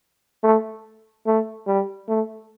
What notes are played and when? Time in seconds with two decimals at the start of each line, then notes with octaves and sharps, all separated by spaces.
0.43 A3
1.26 A3
1.67 G3
2.08 A3